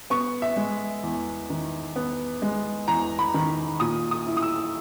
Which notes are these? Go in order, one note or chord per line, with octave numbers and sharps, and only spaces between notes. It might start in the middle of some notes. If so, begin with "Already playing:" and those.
B3 C#6
E5
G#3
E2
D#3
B3
G#3
E2 A#5
B5
D#3
A#2 D#6
D#6
E4
D#6
E6